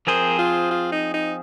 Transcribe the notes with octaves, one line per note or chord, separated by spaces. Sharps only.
F3 C4 G#4 A#4 C5
F4
F4
D#4
D#4